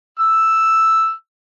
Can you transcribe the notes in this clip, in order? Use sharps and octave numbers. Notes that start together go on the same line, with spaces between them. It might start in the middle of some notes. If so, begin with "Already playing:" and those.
E6